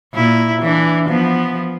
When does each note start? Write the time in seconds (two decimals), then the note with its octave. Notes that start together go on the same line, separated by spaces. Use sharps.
0.13 A#2 E4
0.62 E3 D4
1.09 F3 B3